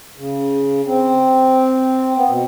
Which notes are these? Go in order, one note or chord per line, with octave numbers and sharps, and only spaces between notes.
C#3
C4
B3
B2